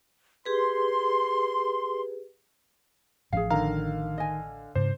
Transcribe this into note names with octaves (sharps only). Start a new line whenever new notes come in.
G4 G#4 B4 C6
A1 F3 C#4 G#4 F5
D3 D#3 F5 A#5
D#5 G#5
G#2 C#3 D4 C5